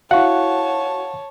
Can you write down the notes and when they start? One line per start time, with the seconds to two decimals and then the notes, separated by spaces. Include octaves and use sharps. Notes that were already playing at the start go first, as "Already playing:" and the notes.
0.11 E4 F#4 C#5 F5 F#5 A5 C#6